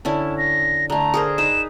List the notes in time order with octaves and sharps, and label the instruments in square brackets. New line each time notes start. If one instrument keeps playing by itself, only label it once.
[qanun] D3 C#4 E4 [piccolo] A5
[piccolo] A#6
[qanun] D3 A3 [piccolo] A#5
[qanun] G#4 A#4 C5
[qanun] D#4 B4 [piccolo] E7